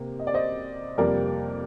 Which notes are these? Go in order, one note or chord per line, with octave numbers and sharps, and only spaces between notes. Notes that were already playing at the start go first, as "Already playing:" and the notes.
Already playing: C3 A#3
D#5
D5
C5 D#5
F2 C3 G3 A#3 A#4 D5